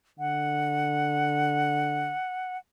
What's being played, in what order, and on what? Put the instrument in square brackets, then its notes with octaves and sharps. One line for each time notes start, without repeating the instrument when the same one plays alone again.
[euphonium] D3 [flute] F#5